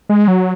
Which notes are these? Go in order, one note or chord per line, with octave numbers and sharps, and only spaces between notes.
G#3
F#3